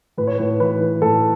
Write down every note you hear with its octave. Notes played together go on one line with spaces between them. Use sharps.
A2 B4
C#5
A2 B4
E3 B4
E3
A2 A4